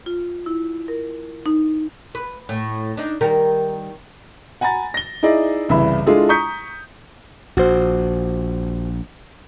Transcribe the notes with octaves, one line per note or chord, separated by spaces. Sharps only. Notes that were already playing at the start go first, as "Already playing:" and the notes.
F4
E4
A#4
D#4
B4
A2
D4 D#4
D#3 G3 A#4
F#5 G#5 A#5 B5 A6
A#6 G7
D#4 E4 G#4 D5 D#5
G1 C2 C#3 E3 E5 B5
G#3 D4 E4 F4 G#4 A4
A#5 C#6 D#6 G6 B6 C#7
A#1 F#4 C5